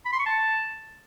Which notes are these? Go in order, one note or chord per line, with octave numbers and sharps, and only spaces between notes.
B5
C6
C#6
A5